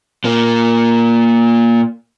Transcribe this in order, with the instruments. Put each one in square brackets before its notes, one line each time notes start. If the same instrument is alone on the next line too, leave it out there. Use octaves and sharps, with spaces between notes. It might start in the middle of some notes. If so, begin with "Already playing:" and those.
[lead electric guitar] A#2 A#3